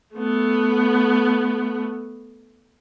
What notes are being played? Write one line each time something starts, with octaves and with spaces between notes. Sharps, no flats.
A3 B3